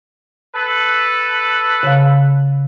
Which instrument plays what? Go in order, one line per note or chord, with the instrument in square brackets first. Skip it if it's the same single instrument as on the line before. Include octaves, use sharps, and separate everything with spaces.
[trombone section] A4 B4
[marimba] C#3 F5